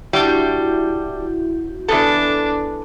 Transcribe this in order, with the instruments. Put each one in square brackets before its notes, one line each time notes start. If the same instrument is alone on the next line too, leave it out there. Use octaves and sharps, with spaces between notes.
[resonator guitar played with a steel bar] G3 D4 [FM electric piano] E4 F#4 G6
[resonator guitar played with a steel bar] E3 B3 A4 [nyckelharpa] D4